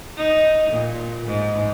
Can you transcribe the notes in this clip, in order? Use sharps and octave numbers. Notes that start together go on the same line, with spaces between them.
D#4
A#2
G#2